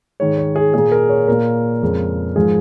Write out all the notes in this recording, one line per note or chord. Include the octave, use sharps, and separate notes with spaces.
G#2 D#3 G#3 C#5
C#5
G#4
A#2 A#3 G#4
A#4
C#5
A#2 A#3 A#4
F2 C#3 G#3
G#2 F3 G#3 G#4